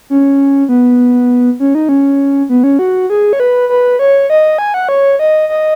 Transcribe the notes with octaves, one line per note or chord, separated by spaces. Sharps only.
C#4
B3
C#4
D#4
C#4
B3
C#4
F#4
G#4
C#5
B4
B4
C#5
D#5
G#5
F#5
C#5
D#5
D#5